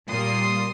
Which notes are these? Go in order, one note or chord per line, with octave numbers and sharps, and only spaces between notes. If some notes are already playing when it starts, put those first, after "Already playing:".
A#2 G3 A#3 C6 D#6